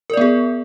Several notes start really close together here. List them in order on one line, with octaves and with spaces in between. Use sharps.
A#4 D5 B3 G#4